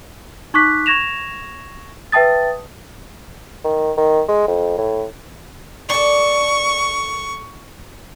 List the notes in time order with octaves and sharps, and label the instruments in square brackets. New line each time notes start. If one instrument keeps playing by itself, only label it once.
[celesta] D#4 C#6 D6 F#6 B6
C#6 G#6 A#6 E7 F7
B4 E5 G5 A5 D#6 A6
[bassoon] D#3
D#3
G#3
F2
A2
[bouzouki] A4 D5 [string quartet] C#6